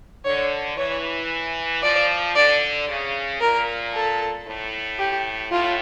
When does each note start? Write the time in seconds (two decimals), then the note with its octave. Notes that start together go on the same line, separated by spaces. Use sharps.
0.25 D3 C#5
0.77 E3 C#5
1.83 F3 D5
2.35 D3 D5
2.88 C#3
3.40 A#2 A#4
3.93 A4
4.46 A2
4.98 G4
5.51 A2 F4